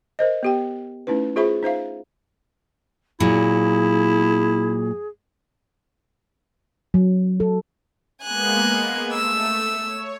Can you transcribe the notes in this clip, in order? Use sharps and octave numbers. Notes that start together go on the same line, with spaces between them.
A#4 C5 D#5
B3 G4 G5
A3 C#4 D#4 E4 B4
F4 G#4 C5 E5 B5 C#6
D#4 C5 E5 F5
A#2 F#3 E4 G#4
F#3
A4
G#3 A#3 B3 G#5 F#6
A3 E6
C#5